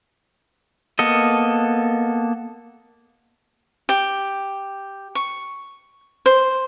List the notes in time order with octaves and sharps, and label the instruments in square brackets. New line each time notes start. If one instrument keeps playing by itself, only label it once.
[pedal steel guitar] A#3 B3 A4 D#5
[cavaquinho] G4
C#6
C5